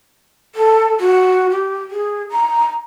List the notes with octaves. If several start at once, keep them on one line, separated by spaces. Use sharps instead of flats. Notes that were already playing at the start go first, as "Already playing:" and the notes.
A4
F#4
G4
G#4
A#5